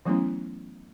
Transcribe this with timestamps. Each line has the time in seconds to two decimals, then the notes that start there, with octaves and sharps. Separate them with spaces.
0.05 E3 F#3 A3 B3 C#4 E4